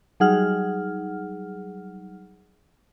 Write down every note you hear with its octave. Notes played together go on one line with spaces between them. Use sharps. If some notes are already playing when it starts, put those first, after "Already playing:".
F#3 G3 D#4 G#4 F#5 F6